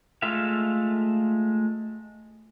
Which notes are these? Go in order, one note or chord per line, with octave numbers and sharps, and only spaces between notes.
G#3 A3 F4 E5 F5